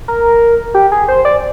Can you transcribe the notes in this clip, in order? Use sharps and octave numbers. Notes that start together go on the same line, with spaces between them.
A#4
G4
G#4
C5
D5